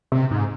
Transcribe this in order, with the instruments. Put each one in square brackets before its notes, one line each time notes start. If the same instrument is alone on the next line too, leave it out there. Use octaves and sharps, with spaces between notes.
[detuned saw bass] C3
G#2